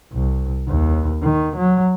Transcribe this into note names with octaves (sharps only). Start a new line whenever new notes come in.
C2
D#2
D#3
F#3